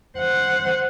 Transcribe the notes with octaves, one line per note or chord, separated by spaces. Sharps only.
C5 F#5